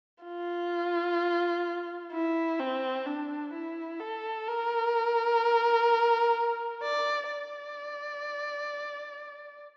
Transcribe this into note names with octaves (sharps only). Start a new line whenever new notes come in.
F4
E4
C4
D4
E4
A4
A#4
D5
D5